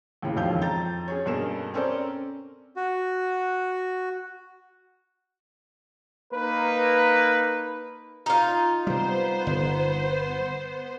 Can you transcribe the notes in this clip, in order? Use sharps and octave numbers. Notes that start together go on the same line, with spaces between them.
D#2 A2 C#3
E1 A#1 F2 D#3 F5 G6
F2 A#5 G6 A6
C#4 G#4 C#5
G2 B2 A#3 G#4 A4 E7
C4 C#4 A4 A#4 C5 D5
F#4
A#3 D#4 B4
D#4 F4
C3 G3 B3 C5
G1